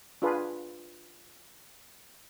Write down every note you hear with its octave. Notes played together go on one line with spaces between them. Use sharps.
D4 F4 G#4 B4